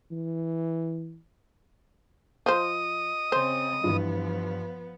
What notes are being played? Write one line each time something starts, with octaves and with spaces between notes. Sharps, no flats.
E3
F3 F4 C5 D#5 D#6
C#3 C4 C5
G2 E3 F3 B3